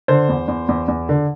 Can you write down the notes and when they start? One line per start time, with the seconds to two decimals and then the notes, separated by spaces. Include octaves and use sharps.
0.08 D3 C5
0.29 E2
0.48 E2
0.69 E2
0.88 E2
1.09 D3